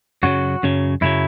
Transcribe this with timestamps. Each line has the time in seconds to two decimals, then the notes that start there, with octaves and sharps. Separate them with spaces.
0.23 F#2 C#3 F#3 F#4
0.63 F#2 C#3 F#3
1.01 F#2 C#3 F#3 E4